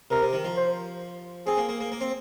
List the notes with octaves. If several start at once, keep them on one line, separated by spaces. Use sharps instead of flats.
C3 A#4
C3
D#3
F3
C5
C4 G#4
A#3
A#3
A#3
A#3
C4